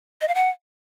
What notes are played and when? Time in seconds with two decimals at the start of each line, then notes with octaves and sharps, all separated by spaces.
0.21 D#5
0.28 F5
0.35 F#5